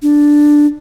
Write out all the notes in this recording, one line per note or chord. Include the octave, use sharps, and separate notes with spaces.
D4